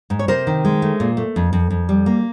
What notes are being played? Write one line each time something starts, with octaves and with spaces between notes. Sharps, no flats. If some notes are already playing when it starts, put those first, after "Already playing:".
G#2
C#5
C3 A#4 C5
D#3
G#3
A3
A#2
A3
F2
F2
F2
G3
A#3